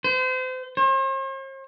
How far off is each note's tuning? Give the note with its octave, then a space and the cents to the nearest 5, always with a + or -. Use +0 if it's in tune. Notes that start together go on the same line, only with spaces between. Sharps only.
C5 -35
C5 +45